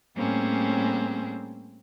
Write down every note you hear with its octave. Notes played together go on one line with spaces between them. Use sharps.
A2 G3 A#3 C4 C#4 G#4